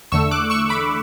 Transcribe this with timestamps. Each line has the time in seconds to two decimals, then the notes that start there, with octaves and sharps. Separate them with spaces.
0.12 E2 D3 A3 C#6 E6
0.31 D6 F#6
0.50 C#6 E6
0.69 B5 D6